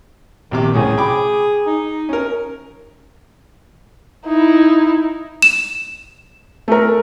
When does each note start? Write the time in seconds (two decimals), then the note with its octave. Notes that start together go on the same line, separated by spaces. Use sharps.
0.51 A#1 C3 D#3 D6
0.74 C2 A2 C#4 G#4
0.97 G5 B5 D6
1.67 D#4
2.09 C#4 A#4
4.26 D#4 E4
5.42 E7
6.68 A3 A#4